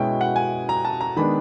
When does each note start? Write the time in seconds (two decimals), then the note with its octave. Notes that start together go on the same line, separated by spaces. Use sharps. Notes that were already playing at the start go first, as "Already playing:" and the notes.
Already playing: B2 G#3 C#4 E4 G5
0.21 F#5
0.36 G#5
0.69 A#5
0.85 A5
1.01 A#5
1.17 D#3 G#3 B3 D4 B5